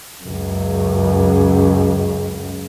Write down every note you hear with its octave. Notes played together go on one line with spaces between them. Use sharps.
C#2 F#2